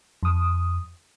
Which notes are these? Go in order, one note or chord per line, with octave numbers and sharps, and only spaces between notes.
F2 D#6